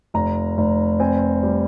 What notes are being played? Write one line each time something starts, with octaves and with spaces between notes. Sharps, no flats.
F1 A#5
F1
C4 G#5
G3